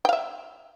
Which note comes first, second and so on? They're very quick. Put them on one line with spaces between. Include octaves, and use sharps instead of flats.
G5 F5 E5